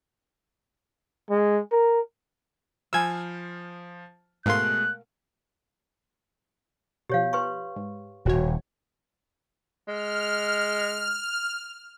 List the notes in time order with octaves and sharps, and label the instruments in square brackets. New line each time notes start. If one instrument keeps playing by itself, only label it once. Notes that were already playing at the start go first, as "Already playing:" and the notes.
[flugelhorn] G#3
A#4
[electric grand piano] F3 C5 F6 [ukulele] G#5 B5 [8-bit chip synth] E6 G#6
[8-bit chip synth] G#2 C6 [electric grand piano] B2 G#3 A3 [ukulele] A#4 F5 [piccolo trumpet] F#6
[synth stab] B2 F3 [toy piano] G4 C#5 F5
[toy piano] B4 C6 C#6
[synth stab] G#2
[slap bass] D#1 [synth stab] A1 F#4 C#5
[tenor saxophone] G#3 [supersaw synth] F6